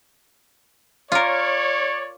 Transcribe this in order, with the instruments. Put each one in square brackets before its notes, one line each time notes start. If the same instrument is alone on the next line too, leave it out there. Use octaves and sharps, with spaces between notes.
[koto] F4 A#4 [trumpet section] C#5 D5